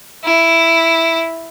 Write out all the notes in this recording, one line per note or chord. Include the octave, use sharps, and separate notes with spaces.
E4